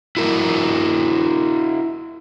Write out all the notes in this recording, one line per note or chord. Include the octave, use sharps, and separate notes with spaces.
E4 F#4 A#4